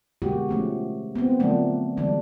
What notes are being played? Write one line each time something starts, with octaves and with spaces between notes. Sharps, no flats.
B2 D3 G#3 A#3 F#4 G4
F3 A3 C#4
B3 C4
D3 F3 F#3 A3 A#3 D4
D3 E3 G3 G#3 D4